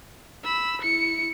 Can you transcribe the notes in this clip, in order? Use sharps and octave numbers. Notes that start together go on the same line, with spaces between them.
B5 E6
E4 C#7